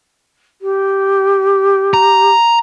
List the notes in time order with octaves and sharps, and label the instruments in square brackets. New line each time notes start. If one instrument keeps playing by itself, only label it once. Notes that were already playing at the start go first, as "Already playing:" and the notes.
[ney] G4
[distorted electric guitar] A#5